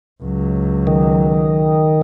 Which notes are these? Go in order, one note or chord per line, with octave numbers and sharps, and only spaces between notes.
C#2 F#3
D#3